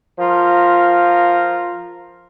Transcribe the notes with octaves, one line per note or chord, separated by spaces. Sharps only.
F3 F4 A#4